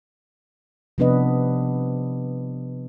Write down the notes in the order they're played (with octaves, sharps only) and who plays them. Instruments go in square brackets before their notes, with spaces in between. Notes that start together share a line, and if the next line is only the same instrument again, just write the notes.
[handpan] C3 F3 B3 D4 B4 D#5